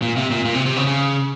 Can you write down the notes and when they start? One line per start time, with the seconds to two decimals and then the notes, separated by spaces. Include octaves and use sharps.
0.02 A#2
0.17 C3
0.31 A#2
0.45 A#2
0.54 C3
0.66 C3
0.76 C#3
0.87 C#3